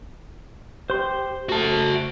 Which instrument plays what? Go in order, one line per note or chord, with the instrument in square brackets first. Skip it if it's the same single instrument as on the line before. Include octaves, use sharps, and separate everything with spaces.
[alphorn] G4 [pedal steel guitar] C5 C6
[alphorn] A3 [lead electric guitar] F#4 A5